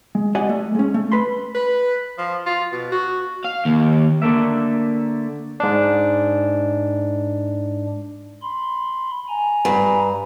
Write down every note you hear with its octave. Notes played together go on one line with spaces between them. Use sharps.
G#3
G4 D5 D#5 F#5 G#5
A3
G#3 C#4
A3
B4 B5 C6
B4
F3
F4
B2
F#4
F5
D#2
D3 A3 A#3 E5
G#2 D4
B5 C6
G#5 A#5
G2